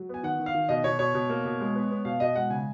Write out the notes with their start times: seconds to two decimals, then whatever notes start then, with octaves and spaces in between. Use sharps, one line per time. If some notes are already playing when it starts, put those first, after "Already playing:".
Already playing: F#3
0.09 B3 G#5
0.23 D#3 F#5
0.40 D#3
0.46 F5
0.55 D#3
0.69 B2 D#5
0.84 B2 C#5
0.99 B2 C#5
1.14 B2
1.30 A#3
1.45 B2
1.60 G#3
1.75 B3
1.91 B3
2.05 B2 F5
2.20 B2 D#5
2.36 G#3 F#5
2.50 C#3 G#5